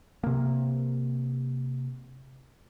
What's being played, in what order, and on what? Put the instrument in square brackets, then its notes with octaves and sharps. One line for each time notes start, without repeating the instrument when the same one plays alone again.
[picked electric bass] C3 A#3